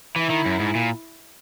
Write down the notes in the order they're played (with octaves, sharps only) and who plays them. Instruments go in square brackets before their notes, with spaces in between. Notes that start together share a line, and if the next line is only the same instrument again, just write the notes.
[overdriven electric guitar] E3 [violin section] E4
[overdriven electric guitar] D#3
F#2
G#2
A#2